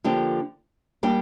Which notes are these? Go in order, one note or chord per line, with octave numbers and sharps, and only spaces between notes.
D3 F3 A#3 D4 G4
G3 A#3 D4 G4